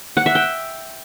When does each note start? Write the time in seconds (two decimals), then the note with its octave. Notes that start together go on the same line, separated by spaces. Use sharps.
0.17 F#5
0.26 E5
0.35 G5